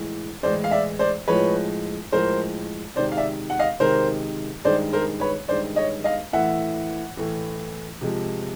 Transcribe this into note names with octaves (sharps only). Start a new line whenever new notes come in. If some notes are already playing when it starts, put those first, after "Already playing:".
Already playing: A2 E3 G#3
A2 E3 G#3 C5 D5
F5
D5 E5
C5 D5
A2 F3 G#3 B4 C#5
A2 F3 G#3 A#4 C5
C3 D#3 G#3 C5 D5
F5
D5 E5
F#5
D#5 F5
C3 D#3 G#3 A#4 C5
G2 D#3 G#3 C5 D5
A#4 C5
B4 C#5
G2 D#3 G#3 C5 D5
C#5 D#5
D#5 F5
A2 E3 A3 E5 F#5
A2 E3 A3
C3 F3 G#3